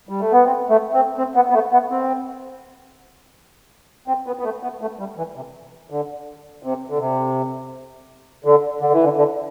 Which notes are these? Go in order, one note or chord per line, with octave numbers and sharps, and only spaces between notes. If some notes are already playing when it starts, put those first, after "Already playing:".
G3
A3
B3
C4
A3
C4
C4
B3
B3
A3
B3
C4
C4
B3
B3
A3
B3
A3
G3
E3
C3
D3
C3
D3
C3
D3
D3
E3
D3
D3